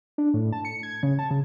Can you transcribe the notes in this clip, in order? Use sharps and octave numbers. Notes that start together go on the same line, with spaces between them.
D4
A2
A5
C#7
G#6
C#3
A5
C#3